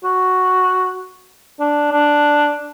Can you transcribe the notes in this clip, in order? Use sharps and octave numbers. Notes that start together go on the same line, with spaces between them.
F#4
D4
D4